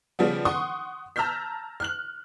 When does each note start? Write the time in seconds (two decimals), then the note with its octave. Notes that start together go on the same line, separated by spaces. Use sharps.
0.19 C#3 F3 G3 B3
0.45 F#5 C6 C#6 D#6
1.16 A5 A#5 E6 F6 G6 B6
1.80 F6 F#6 F#7